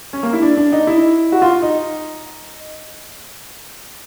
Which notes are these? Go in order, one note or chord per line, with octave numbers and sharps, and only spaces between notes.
C#4
A#3
E4
D4
D4
D#4
E4
F#4
F4
D#4